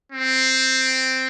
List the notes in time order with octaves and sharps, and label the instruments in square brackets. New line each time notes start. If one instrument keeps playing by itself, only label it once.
[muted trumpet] C4